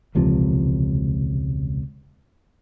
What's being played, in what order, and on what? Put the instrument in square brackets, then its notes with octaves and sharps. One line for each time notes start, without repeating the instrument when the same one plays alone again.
[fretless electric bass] E1 C#2 C3 F3